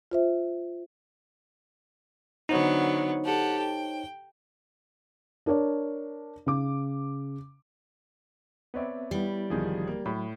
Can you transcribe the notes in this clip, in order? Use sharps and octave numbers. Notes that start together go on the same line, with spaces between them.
F4 C5 E5
D3 F#3 B3 D#4 C5 C#5
G4 A4 F#5
G5
D4 A#4 C#5 D5
C#3 D6
B3 C4 B4 C#5 D5 E5
G3 B3 E4
D1 D#3 F3 G#4
A#3
A2 F#3 B5